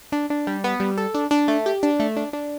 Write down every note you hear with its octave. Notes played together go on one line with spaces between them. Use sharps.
D4
D4
G3
B3
G3
A4
D4
D4
A3
G4
D4
A3
D4
D4